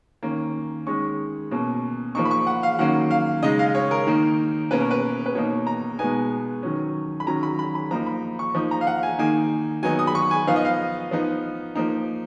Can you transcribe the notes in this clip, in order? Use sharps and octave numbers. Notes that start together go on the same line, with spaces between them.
D#3 A#3 C#4
D#3 G#3 C#4 C#6
B2 A#3 C#4
F3 A#3 D#4 C#6
B5
C#6
F#5
F5
D#3 F#3 A#3 C#4 F#5
F5
C#3 G#3 D#4 D#5
F5
C#5
A#4
D#3 A#3 D#4
B2 A#3 C#4 B4
A#4
B4
B4
B2 A#3 D#4 C#5
A#5
B2 G#3 B3 D#4 G#5
D#3 F#3 C#4
B5
D#3 F#3 C#4 A#5
B5
B5
B5
F3 A#3 D#4 A#5
B5
C#6
F3 A#3 D#4
A#5
F5
F#5
G#5
D#3 A#3 D#4 G#5
D#3 F#3 B3 D#4 G#5
D#6
B5
C#6
G#5
F3 B3 D#4 F5
D#5
F5
F3 B3 D#4
F3 A#3 D#4